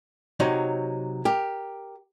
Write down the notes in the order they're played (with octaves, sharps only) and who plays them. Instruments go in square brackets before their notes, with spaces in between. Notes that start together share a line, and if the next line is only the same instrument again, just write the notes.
[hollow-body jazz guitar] C3 F#3 D#4 C#5
G4 A#4